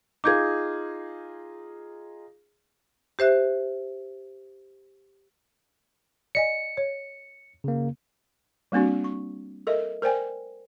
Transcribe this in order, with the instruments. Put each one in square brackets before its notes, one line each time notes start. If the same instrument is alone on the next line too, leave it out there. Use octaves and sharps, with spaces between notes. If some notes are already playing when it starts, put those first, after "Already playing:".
[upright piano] D#4 F4 G#4 [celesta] D6 G6 G#6
[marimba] G4 C5 E5 F#6
[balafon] D5 D#5 G#5 [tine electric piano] C#7
[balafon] C#5
[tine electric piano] C#3 A#3
[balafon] G3 A#3 C4 D4 F#4
C#6
A4 A#4 D#5 E5
A#4 C5 D5 G5 G#5